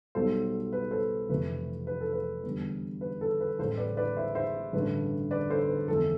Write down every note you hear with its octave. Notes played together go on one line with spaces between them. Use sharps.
B1 B2 G3 A4 C5
B4
A4 C5
F1 F2 C3 E3 A3 B4
B4
A4
B4
E2 D3 G3
B4
A4
B4
A1 A2 G3 A4 C5
B4 D5
B4 D5
C5 E5
C5 E5
A1 G2 D3 A3 B4
B4 D5
A4 C5
B4
G1 F2 E3 A4